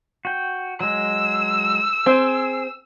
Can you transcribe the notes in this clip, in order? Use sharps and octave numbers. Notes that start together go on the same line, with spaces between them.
F#4 G5
F#3 G#3 E6
C4 G#4